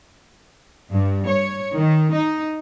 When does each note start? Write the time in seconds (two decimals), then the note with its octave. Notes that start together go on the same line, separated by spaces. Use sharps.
0.92 G2
1.27 C#5
1.75 D#3
2.14 D#4